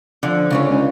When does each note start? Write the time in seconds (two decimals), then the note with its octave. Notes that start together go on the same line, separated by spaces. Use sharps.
0.23 D3 F3
0.51 C#2 C#3 C#4 C#5
0.69 C#2